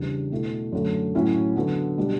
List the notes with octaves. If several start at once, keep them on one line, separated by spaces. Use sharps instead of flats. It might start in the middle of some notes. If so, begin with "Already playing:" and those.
Already playing: E2 C#3 G3 D4
B2 A3 E4
F#2 D3 A3
A2 F#3 C#4 E4
D3 F#3 B3
B2 G3 D4